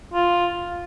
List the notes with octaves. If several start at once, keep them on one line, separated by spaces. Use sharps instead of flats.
F4